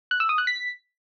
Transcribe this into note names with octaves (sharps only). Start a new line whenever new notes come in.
F#6
E6
D#6
F#6
B6